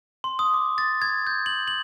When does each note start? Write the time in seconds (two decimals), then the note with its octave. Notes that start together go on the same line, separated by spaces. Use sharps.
0.24 C6
0.39 D#6
0.54 D6
0.78 A6
1.02 G#6
1.27 G6
1.46 F#7
1.68 F#7